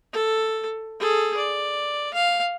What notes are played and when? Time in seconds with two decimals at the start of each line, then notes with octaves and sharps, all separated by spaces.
0.13 A4
1.00 G#4 A4
1.37 D5
2.14 F5